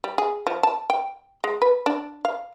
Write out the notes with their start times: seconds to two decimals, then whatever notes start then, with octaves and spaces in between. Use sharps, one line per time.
0.04 G3
0.18 G#4
0.47 F3
0.63 A5
0.90 G5
1.44 G#3
1.62 B4
1.86 D4
2.25 F5